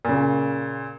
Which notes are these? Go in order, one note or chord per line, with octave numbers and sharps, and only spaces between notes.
A#2 C#3